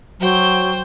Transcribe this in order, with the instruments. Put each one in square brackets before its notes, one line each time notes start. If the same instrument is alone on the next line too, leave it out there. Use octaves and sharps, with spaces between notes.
[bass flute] F#3 [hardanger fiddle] C5 G5